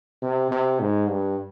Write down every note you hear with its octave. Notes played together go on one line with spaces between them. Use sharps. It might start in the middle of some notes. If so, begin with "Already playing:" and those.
C3
C3
G#2
G2